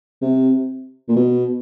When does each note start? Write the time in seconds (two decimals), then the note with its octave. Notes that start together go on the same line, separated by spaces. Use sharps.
0.22 C3
1.08 A#2
1.16 B2